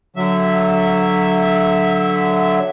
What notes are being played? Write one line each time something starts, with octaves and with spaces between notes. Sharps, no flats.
D3 F#3 E5